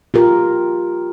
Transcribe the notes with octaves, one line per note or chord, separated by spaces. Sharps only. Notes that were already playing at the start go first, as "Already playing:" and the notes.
F4 G4 A#4